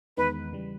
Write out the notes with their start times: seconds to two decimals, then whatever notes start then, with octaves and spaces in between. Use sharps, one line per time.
0.17 E2 D#3 G#3 B3 D#4 B4
0.53 C#3 E3 G3